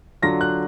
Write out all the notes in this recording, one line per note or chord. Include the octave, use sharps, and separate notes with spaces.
D3 F#3 D4 F4 A#6
F#6